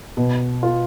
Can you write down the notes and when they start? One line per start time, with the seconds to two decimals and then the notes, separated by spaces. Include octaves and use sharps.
0.17 B2
0.63 F4